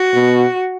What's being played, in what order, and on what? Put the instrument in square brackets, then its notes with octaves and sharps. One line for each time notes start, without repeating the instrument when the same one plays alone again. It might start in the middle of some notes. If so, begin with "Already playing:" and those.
Already playing: [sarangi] F#4
[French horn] B2